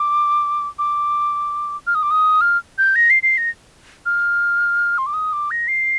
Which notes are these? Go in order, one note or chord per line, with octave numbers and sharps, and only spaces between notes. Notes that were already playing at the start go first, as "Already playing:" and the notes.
Already playing: D6
D6
F6
D#6
D6
D#6
F6
G6
A#6
C7
C7
A#6
F6
C6
D6
D#6
D6
A#6
C7